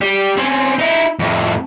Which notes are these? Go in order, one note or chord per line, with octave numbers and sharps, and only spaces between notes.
G4 D5
C4 C#4
D#4 E4
F2 A2